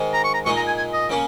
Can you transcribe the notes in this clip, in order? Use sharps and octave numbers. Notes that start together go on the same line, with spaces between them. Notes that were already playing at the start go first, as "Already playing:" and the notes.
Already playing: G#2 D#3 G#3
A#5
C#6
A#5
A#2 G#3 D#4 C#6
A#5
G#5
G#5
D#5
C#3 A#3 C#4